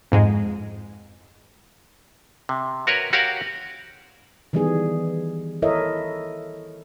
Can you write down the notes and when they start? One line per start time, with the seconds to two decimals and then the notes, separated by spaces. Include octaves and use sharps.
0.12 F2 G#2 G#3
2.49 C3
2.87 F#4 A#4 B4 C#5
3.13 F#4 G4 A#4 C#5 F5 F#5
4.53 D#3 E3 G3 B3 G#4
5.62 E4 A4 A#4 C#5 D#5 E5